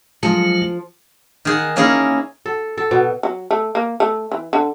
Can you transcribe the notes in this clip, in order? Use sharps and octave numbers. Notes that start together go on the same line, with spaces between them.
F3 F#3 G#3 F4
D#3 G#4 F#5
A#3 C#4 E4 G#4 A#4
A4
A4
B2
F#3
A3
A#3
A3
E3
D3